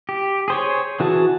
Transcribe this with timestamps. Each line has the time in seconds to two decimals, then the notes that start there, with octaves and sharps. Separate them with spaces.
0.09 G4
0.48 G#4 C5 C#5
1.00 E3 F#4 G#4 A5